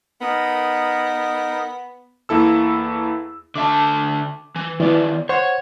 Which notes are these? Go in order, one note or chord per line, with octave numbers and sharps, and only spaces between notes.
B3 D#4 A#4 D#6
E2 A#3 E4 A4 E6
D3 E5 A5 D6
E3
D#3 E3 B3 D5
C5 C#5 F#5 C#6